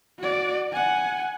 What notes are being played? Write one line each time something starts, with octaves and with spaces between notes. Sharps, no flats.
F#4 D5
F#5 G#5